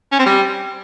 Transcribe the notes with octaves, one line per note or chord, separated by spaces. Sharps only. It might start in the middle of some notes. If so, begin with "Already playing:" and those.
C#4
C4
G3